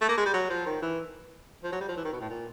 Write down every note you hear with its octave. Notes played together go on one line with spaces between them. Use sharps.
A3
A#3
G#3
G3
F#3
F3
D#3
E3
F3
F#3
G3
F3
E3
D#3
B2
A2
A#2